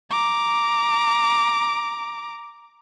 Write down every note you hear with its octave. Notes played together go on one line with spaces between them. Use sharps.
A#5 D6